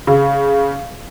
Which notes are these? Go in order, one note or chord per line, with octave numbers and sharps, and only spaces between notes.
C#3